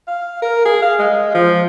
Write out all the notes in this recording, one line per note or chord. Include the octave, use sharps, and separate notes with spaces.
F5
A#4
G#4
F5
G#3
F3